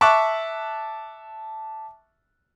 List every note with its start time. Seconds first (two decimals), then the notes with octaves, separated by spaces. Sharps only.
0.01 E5 A5 C#6 D6 F#6